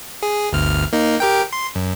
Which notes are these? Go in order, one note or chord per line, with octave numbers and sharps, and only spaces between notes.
G#4
G1 D2 F6
A#3 D#4
G4 A#4 G5
C6
F#2